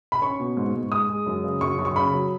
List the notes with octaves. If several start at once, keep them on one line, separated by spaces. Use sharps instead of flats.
B5
C#4 C#6
B2
G#2
G#2
G#3 D#6
G#3
F#2
C#3
F#2 C#6
F#2
C#6
C#3 B5
F#3